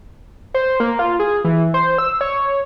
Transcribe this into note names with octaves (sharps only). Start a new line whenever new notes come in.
C5
A#3
F4
G#4
E3
C5
E6
C#5